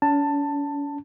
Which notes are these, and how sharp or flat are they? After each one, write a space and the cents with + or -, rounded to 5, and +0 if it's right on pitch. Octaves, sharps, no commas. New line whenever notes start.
C#4 +45 A5 +10